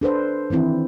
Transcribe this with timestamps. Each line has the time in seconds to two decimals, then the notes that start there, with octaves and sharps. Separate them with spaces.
0.01 D4 A4 B4 C5
0.50 D#3 E3 C4 E4